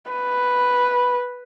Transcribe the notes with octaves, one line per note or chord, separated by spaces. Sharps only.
B4